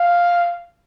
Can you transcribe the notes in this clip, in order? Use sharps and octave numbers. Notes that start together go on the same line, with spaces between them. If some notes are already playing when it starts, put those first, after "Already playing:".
Already playing: F5